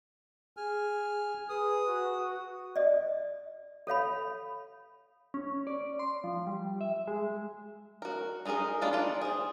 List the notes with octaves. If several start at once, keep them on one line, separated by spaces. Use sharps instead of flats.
G#4 G#5 F6
G#4 B4 D#6
F#4
D5 D#5
A4 C#5 F5 B5
C#4
D5
C6
F3
G3
E5
G#3
F#4 A#4
G#3 D#4 F4 G#4 A#4
G#3 A#3 D4 E4 F4
D#4 F4 D5
G#4 C5